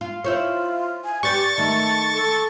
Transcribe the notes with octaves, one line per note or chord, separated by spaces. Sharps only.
F4
E4 F4 C5 C#5
G#5
G4 B4 D5 C#6 A6
D#3 A3 A5
A4